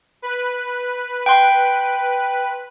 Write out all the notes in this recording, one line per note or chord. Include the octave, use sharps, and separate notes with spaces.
B4
G5 C6